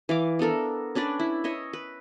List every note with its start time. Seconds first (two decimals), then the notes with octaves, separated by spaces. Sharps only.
0.09 E3 F5 D6
0.39 B3 D4 A4 A#4
0.95 C#4 D4 B4 D5
1.20 E4
1.44 C#5 D#5 E5
1.73 B4